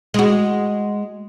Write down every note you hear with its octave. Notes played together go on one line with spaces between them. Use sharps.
G#3 F#4